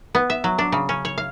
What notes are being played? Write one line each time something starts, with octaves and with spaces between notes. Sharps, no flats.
B3
E5
F#3
D4
C#3
C#4
C#5
F5